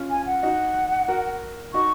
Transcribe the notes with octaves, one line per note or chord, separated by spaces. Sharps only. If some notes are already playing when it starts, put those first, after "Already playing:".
Already playing: C#4 F4
G#5
F#5
D#4 F#4
F#4 A#4
D#4 F#4 C#6